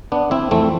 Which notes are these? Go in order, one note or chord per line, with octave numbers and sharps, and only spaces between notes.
B3 D4
C4 E4
F2 E3 A3 C4